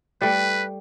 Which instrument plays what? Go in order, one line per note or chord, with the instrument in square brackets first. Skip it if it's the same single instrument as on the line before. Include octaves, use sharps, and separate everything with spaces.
[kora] G3 A3 [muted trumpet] B4